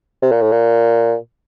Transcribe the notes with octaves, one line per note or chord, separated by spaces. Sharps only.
C3
A#2
A2
A#2